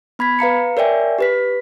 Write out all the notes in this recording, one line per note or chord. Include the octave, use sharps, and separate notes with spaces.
B3 B5 G#6 B6
B4 F5 A#5 C#7
A#4 C#5 D5 E5 G5 G#5
G4 B4 B6